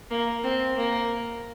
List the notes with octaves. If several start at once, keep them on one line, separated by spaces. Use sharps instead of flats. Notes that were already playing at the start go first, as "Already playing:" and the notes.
A#3
C4
A#3